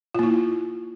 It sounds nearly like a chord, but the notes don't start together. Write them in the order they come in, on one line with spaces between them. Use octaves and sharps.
F4 A#3 E4